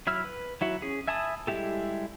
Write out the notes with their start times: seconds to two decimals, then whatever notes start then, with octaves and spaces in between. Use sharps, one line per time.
0.07 F#3 E4 E6 F6
0.24 B4
0.61 F#3 E4 F#4
0.82 C#4 G#4
1.08 E5 G#5 A5 B5 D#6
1.47 G3 G#3 E4 G4 A4